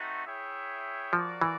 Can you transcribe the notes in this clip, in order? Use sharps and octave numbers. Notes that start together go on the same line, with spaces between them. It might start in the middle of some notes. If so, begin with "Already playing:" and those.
Already playing: A3 C4 D#4 F#4
E4 G#4 C#5 E5 G5
F3 F#4 A#4 D5 F5
E3